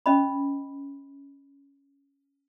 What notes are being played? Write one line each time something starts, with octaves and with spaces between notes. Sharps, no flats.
C#4 D#5 B5